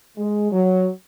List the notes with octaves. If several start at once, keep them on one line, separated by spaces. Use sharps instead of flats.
G#3
F#3